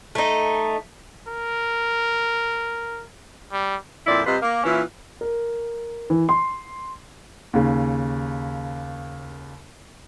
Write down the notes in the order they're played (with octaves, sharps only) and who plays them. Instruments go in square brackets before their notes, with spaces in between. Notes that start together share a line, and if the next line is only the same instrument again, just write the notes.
[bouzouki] A3 D#4
[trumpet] A#4
G3
[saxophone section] F2 A#2 C4 E4 D5
C3 G3 F4 B4 D#5
A#3
A#2 E3 C#4 E4
[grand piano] A#4
E3
C6
D#2 C#3